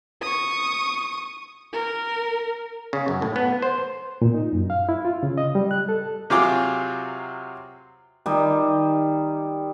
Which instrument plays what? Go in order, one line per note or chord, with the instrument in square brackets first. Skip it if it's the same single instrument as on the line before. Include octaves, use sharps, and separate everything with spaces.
[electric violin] C#6 D#6
A#4
[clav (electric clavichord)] C#3
F#2
A2
B3
C5
[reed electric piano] A#2
D#4
F#2
F5
E4
F4
C#3
D#5
G3
F#6
A4
[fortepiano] C3 F#3 F4 G#4 D6
[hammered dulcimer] D#3 G3 D#5 A#5